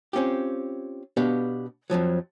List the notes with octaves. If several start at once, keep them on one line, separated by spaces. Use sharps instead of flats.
C4 C#4 F4 G4
B2 B3 D4 G4 C#5 F5
F2 G#2 F3 F#3